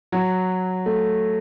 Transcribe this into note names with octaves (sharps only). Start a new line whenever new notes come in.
F#3
A3